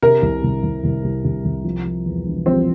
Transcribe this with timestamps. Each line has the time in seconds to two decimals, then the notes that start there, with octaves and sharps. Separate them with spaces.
0.02 C3 A#4
0.22 C2
0.43 C2
0.63 C2
0.84 C2
1.04 C2
1.25 C2
1.45 C2
1.64 F3
1.85 F3
2.05 E2
2.26 E1
2.46 F3 C4